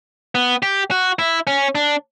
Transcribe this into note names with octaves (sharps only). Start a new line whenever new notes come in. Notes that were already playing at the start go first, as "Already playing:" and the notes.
B3
G4
F#4
E4
C#4
D4